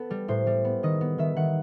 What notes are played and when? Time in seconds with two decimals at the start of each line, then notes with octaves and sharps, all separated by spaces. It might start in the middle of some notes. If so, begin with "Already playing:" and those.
Already playing: B3 A4
0.10 G3
0.28 A2 C5
0.47 G3
0.65 B3
0.83 D#3 D#5
1.01 B3
1.18 D#3 E5
1.36 D#3 F#5